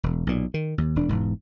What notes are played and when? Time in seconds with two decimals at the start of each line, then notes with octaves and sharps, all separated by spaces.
0.03 E1
0.27 B1 A#2
0.54 D#3
0.78 D#2
0.96 E1 D4
1.09 E1 G#2